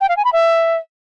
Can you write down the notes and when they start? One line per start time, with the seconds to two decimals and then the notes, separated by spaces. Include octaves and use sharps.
0.01 G5
0.09 F5
0.17 G#5
0.25 B5
0.33 E5